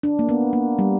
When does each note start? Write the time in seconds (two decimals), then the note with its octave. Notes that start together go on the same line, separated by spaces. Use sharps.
0.03 D4
0.19 A#3
0.29 B3
0.53 A#3
0.79 G3